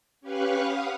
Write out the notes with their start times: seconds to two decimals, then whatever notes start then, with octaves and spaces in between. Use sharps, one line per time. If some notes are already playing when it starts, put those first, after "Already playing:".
0.21 C#4 G4 B4 F5 C#6 F#6
0.62 F5 F#5 B5 D#6 F6